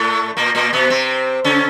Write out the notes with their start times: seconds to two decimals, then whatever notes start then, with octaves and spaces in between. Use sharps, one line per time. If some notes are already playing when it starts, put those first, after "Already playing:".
Already playing: A2 A3
0.37 A#2 A#3
0.55 A#2 A#3
0.73 B2 B3
0.90 C3 C4
1.44 C#3 C#4